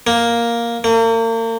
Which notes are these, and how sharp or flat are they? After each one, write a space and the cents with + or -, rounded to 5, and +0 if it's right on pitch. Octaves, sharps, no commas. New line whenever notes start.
A#3 +5
A#3 -40